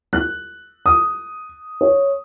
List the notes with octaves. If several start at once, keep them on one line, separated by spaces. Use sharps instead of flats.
F#6
D#6
C#5